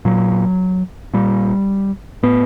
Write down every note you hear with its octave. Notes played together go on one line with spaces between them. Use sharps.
A#2 F#3
A#2 G3
A2 B3